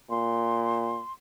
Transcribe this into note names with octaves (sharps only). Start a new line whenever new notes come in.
A#2 C6